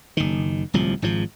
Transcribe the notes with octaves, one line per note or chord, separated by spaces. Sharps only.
F#1 D#3
D1 C2 F3
G#1 G#2 F3